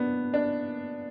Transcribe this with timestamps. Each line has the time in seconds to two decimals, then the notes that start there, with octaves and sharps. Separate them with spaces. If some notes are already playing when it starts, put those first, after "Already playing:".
Already playing: B3 D4
0.34 D4